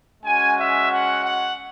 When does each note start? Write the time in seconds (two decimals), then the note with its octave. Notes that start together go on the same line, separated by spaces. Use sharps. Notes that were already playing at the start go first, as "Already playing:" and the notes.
0.23 G#3 C#4 F#4 G#5
0.57 E5
0.91 F#5
1.24 F#5